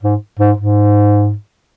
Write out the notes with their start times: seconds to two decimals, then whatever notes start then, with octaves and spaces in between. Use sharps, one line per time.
0.03 G#2
0.39 G#2
0.57 G#2